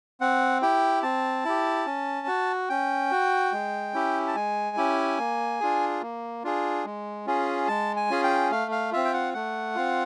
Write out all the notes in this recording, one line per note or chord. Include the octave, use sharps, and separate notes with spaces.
C4 F#5
E4 G4 G5
C4 A5
E4 G4
C#4
F#4
C#4 G5
F#4
G#3
C#4 E4 G4
A5
G#3 G#5
C#4 E4 G4
A#3
D4 F4 G#4
A#3
D4 F4 G#4
G#3
C#4 F4 G#4
G#3 A5
G#5
C#4 F4 G#4
G5
A3 F5
F5
C4 F4 E5
G5
F#5
A3 F#5
C4 F4